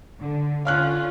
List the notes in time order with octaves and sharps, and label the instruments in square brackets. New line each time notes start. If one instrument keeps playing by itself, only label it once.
[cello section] D3
[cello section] D3 C#4 F4 [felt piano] F5 F6 F#6